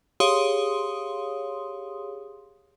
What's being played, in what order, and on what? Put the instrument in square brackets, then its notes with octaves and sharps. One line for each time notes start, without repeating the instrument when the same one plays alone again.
[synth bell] G4 G#4 C#5 F5 C6 D#6